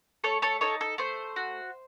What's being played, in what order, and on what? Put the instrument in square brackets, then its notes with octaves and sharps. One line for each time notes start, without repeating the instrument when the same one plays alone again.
[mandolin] A3 A4 C#5
A4 C#5
D#4 A4 C#5
A4
A3 C5
F#4